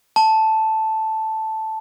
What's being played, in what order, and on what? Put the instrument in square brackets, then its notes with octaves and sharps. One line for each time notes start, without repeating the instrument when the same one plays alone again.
[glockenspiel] A5